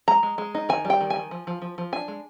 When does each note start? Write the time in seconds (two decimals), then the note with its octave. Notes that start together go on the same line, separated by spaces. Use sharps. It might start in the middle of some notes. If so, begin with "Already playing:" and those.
0.08 G#3 A#5
0.23 G#3
0.38 G#3
0.55 D#4
0.69 D#3 G#5
0.85 G3
0.90 G5
1.01 D#3
1.10 G#5
1.16 D#3
1.31 F3
1.47 F3
1.62 F3
1.78 F3
1.93 D4 G#5
2.08 G#3